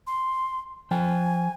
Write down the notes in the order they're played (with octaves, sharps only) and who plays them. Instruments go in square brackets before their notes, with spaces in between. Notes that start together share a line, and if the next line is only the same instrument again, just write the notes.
[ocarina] C6
[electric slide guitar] F3 G5 [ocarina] G#5